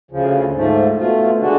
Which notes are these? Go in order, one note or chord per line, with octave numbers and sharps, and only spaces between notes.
D2 C#3 F3
G#2 F3 A3
B2 A3 F4
D3 G#3 D4 F#4